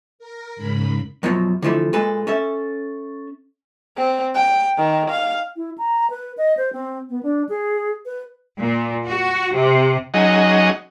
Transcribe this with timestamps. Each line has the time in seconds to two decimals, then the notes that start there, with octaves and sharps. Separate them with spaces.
0.19 A#4
0.56 G#2 C#3 B5
1.23 F#2 B2 F3 F#3
1.62 D3 E3 F3 A3 E4
1.93 A#2 G#3 A4 B4
2.27 C#4 A4 E5
3.97 C4
4.35 G5
4.78 D#3
5.10 F5
5.56 E4
5.78 A#5
6.10 B4
6.38 D#5
6.57 C5
6.73 C4
7.09 B3
7.23 D4
7.49 G#4
8.06 B4
8.61 A#2
9.07 F#4
9.53 C3
10.14 F#3 C#4 D#4 G#4 D#5 F#5